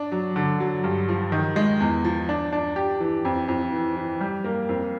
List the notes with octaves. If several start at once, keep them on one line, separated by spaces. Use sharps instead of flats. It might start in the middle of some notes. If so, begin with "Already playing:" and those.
Already playing: D4
F#3
D3
F#3
G2
F3
D#3
G#3
E2
F3
D4
D4
G4
E3
F2
F2
E3
E3
G3
A#3
F2